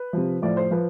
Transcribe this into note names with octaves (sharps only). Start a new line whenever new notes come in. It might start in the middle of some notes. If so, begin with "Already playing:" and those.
Already playing: B4
C3 F3
A2 F3 D5
C5
F3 B4